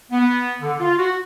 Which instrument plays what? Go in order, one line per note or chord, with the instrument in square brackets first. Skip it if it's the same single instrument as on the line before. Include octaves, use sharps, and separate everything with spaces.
[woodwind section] B3
D3
F4
F#4